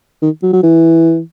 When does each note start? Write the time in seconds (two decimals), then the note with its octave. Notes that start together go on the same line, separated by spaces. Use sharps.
0.22 D#3
0.43 F#3
0.53 F#3
0.63 E3